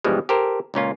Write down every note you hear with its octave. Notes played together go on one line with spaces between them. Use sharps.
G2 B2 E3 F3 G3 G#3
G4 A4 A#4 C5 G#5
C#2 A#2 C#4 F4